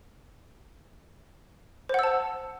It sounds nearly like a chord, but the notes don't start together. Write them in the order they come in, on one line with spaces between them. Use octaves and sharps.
C5 F#5 E6 A5